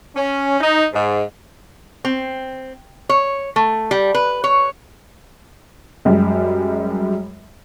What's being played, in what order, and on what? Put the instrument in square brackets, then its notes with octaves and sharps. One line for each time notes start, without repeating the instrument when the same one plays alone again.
[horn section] C#4
D#4
G#2
[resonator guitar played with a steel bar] C4
C#5
A3
G3
B4
C#5
[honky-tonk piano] F#2 G3 G#3